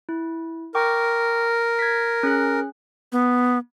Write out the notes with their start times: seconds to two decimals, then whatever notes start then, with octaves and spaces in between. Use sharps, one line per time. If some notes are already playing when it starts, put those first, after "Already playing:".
0.09 E4
0.75 A#4 G5 C#6 D6
1.79 G#6 B6
2.23 C#4 G#4 F#6
3.12 B3